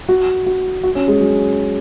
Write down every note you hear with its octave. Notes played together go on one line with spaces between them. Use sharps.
F#4
F#4
F#4
C#4
G#3
F#3